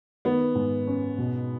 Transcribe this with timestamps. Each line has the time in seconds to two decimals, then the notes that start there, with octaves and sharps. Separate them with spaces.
0.25 D#3 B3
0.55 G#2
0.87 C#4
1.18 B2